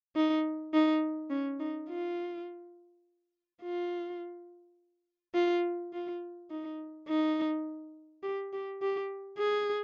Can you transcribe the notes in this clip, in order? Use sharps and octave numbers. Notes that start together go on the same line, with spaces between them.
D#4
D#4
C#4
D#4
F4
F4
F4
F4
D#4
D#4
G4
G4
G4
G#4